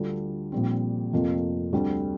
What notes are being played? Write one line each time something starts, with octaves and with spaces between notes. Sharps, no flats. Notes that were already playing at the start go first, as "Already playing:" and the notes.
Already playing: D2 D3 G3 D4 F4
A#1 A#2 G3 C4
F1 F2 C3 A#3 F4
D2 D3 G3 C4